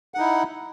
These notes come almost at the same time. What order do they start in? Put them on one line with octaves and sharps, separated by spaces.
F#5 D#4 E4